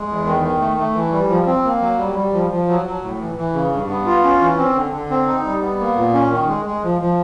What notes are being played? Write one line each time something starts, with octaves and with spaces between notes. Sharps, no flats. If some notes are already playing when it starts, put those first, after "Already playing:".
Already playing: G#3
E2
D#3
D#3
A3
A3
E3
G3
F3
C4
A#3
F#3
G3
G3
F3
F3
F#3
F#3
A2
E3
E3
C#3
G2
B3
F4
C#4
E3
C4
D3
D3
C4
D#4
G3
B3
A#3
A#2
C#4
D#3
G#3
G#3
F3
F3